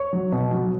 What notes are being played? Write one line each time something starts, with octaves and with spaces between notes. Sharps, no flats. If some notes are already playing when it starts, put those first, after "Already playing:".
Already playing: C#5 C#6
F#3
B2
F#3